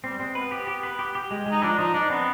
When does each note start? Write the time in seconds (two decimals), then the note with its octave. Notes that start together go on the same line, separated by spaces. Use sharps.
0.04 G3 C4
0.20 G#3 C4
0.35 B3 B4
0.51 G4
0.67 G4
0.83 B4
0.99 G4
1.15 G4
1.31 G#3
1.46 G#3 D#4
1.62 F3 D4
1.79 F3 D#4
1.94 D4 D#4
2.10 B3 C4